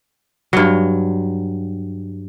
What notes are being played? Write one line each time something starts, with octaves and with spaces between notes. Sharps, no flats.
G2 F#3